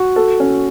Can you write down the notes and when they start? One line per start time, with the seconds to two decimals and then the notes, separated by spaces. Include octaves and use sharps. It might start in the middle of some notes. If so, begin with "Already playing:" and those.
Already playing: F#4
0.16 A4
0.40 C#4